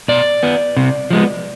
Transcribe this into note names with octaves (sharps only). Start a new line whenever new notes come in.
B2 D5
B3
C3
F3 G#3 B3